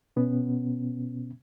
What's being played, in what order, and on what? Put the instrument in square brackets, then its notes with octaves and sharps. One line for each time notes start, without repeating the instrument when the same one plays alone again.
[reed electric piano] B2 B3 C#4